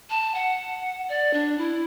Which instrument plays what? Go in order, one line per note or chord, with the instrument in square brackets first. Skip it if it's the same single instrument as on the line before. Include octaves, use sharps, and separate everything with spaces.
[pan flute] A5
F#5
D5
D4
E4